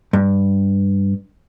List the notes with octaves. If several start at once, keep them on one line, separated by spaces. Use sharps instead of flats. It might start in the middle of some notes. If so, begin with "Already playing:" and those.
G2